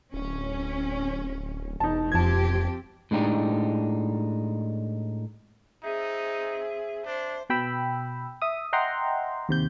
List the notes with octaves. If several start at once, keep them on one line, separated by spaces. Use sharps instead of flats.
D1 C#4
E1 E2 D#4 A5
F2 F3 C4 G4 A5 G#6
A2 G#3 D4 D#4 G4
C4 D#4 G#4 E5
D4 C5
B2 G5 B5 E6
E5 D#6
D#5 E5 F#5 G5 A#5 C6
D#2 C3 G6